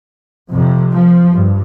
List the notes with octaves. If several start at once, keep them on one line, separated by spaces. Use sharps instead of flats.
F2 C3
F3
G2